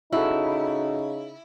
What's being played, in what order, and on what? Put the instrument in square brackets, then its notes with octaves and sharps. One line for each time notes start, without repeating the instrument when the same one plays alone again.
[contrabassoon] C#3 [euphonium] D#4 [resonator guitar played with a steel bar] E4 [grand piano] F#4 A4